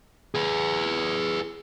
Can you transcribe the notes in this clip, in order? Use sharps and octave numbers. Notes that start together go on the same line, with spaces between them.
G#4 B4